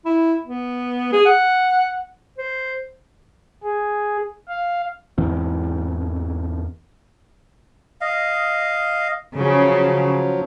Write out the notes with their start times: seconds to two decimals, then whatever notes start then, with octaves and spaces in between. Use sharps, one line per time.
0.05 E4
0.45 B3
1.13 G#4
1.25 F#5
2.38 C5
3.63 G#4
4.48 F5
5.18 E2 G#2 E3 C4
8.01 D#5 F5
9.38 C#3 F3 F#3